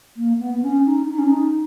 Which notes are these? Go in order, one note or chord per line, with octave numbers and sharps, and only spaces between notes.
A#3
B3
B3
C#4
D#4
D#4
C#4
D#4